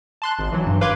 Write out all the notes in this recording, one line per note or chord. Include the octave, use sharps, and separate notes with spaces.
A5 C6 F#6
G#1
E3 F#3
G2
B4 F5 C6 D6 G#6